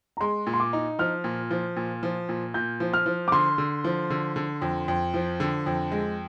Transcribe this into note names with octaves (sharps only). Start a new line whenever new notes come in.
A#5
G#3 C6
A#2
C6
D6
D#4
F3 F6
A#2
F3
A#2
F3
A#2
A#2 G6
F3
F6
F3
D6
D3 C6
D3
F3
D3
D3
F2
F2
F3
D3
F2
G#3